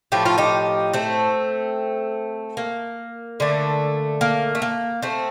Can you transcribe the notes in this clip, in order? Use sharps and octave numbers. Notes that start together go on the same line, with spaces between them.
A2 F3 A3 G4
F4
D#4 G4
A3 C4
A#3
D3 A3
A#3
A3
A#3
A3 C4